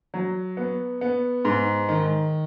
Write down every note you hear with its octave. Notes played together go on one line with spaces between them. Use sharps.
F#3
B3
B3
G#2
D#3